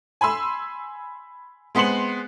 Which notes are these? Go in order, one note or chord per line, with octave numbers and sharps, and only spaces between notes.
G#5 B5 C6 E6
G#3 B3 C4 C6 C#7 F#7